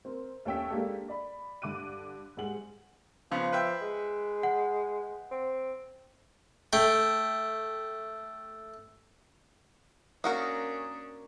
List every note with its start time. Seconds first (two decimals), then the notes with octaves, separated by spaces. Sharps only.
0.05 C4 A#4
0.45 D#2 A3 C#4 G5 E6 B6
0.70 G#3 A#3 D4 G4 A4
1.08 D5 B5
1.62 G2 D3 D6 F#6 D#7
2.37 G#2 G3 G#4 F#5 F#7
3.32 C#3 F3 B3
3.53 B4 E5 G5
3.81 G#3
4.43 F#5
5.31 C4
6.73 A3 G5
10.24 A#3 C#4 D4 F#4 A#4 D#6